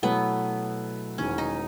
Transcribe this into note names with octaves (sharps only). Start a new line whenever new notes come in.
B2 F#3 A3 B3 E4 B4
E1 E2 D#3 C#4
D#4